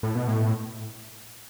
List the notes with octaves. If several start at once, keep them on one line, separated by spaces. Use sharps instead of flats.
A2
B2
A2